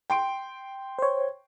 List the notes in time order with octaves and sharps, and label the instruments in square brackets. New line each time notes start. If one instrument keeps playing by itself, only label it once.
[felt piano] G5 C6 D7
[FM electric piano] C5 C#5